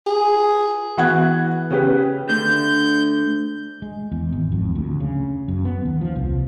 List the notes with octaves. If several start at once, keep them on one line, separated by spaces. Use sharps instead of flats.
G#4
E3 B3 F#4 F#5 F#6 G#6
C#3 C#4 G4 B4
D2 D3 G6
G#3
E2
G#1
F2
D2
C#3
F#2
B3
D#2
F3
C2